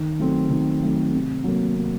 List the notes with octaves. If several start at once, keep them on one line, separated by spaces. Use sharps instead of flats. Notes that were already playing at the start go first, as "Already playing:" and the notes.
Already playing: D#3
F#3 A3 C4
D#3
F#3 A3 C4
C3
F#3 A#3
C3